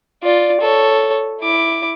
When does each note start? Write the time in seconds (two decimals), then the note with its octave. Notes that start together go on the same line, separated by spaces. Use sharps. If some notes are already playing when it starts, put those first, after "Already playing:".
0.23 F4 D5
0.61 A4 C#5
1.41 E4 D6